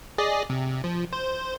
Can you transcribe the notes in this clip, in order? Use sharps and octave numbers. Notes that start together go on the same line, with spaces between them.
G#4 D5 D#5
C3
F3
C5